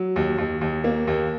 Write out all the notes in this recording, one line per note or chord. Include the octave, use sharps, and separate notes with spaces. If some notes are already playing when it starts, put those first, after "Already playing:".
Already playing: F#3
D#2
D#2
D#2
A#3
D#2